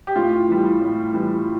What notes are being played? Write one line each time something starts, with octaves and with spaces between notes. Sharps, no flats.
G4
A2 F4
E3 G3
A2
E3 G3